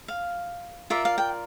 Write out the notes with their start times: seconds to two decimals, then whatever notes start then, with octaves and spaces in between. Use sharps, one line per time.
0.08 F5
0.90 F4 A#4 D5 E5
1.05 F5
1.18 G5